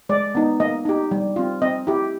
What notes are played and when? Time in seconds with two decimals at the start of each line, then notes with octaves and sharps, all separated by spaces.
0.09 G#3 D5
0.35 B3 D#4
0.60 A#3 D#5
0.85 D#4 G4
1.11 G3
1.36 C4 F4
1.62 C4 D#5
1.87 E4 G4